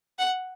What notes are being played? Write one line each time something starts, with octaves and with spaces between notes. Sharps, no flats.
F#5